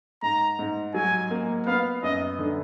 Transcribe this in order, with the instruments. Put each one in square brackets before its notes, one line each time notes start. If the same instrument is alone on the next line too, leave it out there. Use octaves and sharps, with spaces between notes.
[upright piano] G#2 [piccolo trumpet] A#5
[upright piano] G#2
[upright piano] F#3 [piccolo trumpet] G#5
[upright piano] A#3
[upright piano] B3 [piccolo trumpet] F5
[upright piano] F#2 [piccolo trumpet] D#5
[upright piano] D3